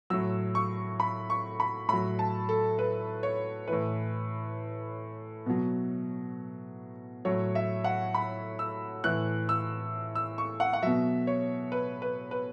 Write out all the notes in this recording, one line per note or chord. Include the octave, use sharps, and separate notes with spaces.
A2 F#3 E6
C#6
B5
C#6
B5
A2 F#3 B5
A5
A4
B4
C#5
A2 E3 B4
B2 F#3
A2 F#3 C#5
E5
F#5
B5
E6
A2 E3 F#6
E6
E6
C#6
F#5
F#5
B2 F#3 E5
C#5
B4
B4
B4